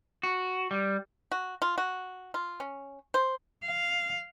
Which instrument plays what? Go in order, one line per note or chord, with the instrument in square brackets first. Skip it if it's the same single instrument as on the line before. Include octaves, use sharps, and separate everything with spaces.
[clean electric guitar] F#4
G3
[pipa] F#4
F4
F#4
F4
C#4
C5
[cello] F5